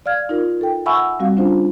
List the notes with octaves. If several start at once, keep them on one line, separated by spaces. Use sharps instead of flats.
D5 F5 F6 G#6
D#4 F4 A#4
A4 G5
E5 F#5 G#5 B5 C#6 E6
G3 C4 F#4 F5
C#4 D4 F4 C5